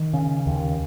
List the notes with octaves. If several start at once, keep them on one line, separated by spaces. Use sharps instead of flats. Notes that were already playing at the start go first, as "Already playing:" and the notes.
Already playing: D#3
C#3
D#2